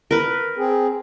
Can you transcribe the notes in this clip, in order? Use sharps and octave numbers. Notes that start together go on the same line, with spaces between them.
A#4 B4
C4 G#4